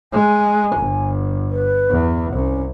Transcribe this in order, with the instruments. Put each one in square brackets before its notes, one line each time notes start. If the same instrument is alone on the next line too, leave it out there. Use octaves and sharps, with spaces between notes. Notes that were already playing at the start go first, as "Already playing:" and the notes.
[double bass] G#3 [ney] G#5
[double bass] G1
[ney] B4
[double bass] E2
[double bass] C2 [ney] C#4